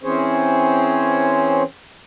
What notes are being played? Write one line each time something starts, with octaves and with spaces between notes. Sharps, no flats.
E3 C4 C#4 G#4 C5 C#5